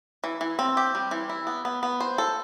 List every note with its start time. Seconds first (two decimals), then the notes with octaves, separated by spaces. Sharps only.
0.24 E3
0.41 E3
0.59 C4
0.77 G4
0.95 G3
1.11 E3
1.30 E4
1.47 B3
1.65 B3
1.83 B3
2.01 C5
2.18 A4